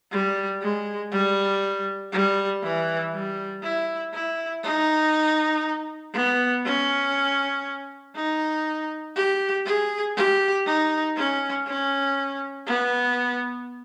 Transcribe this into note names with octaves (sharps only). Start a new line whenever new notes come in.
G3
G#3
G3
G3
E3
G3
E4
E4
D#4
B3
C#4
D#4
G4
G#4
G4
D#4
C#4
C#4
B3